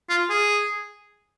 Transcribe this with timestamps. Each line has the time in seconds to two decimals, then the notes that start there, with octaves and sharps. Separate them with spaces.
0.10 F4
0.30 G#4